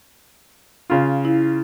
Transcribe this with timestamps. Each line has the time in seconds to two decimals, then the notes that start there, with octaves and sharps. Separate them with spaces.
0.90 C#3 F4
1.25 E4